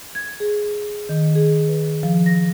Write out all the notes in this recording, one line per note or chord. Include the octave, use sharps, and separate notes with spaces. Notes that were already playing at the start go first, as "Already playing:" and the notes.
G#6
G#4
D#3
G#4
B4
F3
A#6